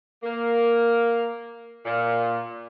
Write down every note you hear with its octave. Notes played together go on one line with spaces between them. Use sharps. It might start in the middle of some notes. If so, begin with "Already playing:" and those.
A#3
A#2